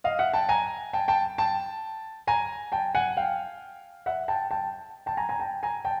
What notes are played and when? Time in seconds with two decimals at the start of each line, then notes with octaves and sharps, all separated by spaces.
0.04 D#5 F5
0.19 E5 F#5
0.33 G5 A5
0.49 G#5 A#5
0.93 G5 A5
1.08 G5 A5
1.38 G5 A5
2.27 G#5 A#5
2.72 G5 A5
2.95 F#5 G#5
3.17 F5 G5
4.06 E5 F#5
4.28 G5 A5
4.51 G5 A5
5.06 G5 A5
5.17 G#5 A#5
5.29 G#5 A#5
5.40 G5 A5
5.63 G#5 A#5
5.85 G5 A5